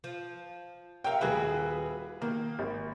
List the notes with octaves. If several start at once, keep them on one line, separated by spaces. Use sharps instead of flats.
F3
A#4 C#5 E5 F5 G5
D#1 E4 F#4 G#4 B4
D#3 A#3
G#1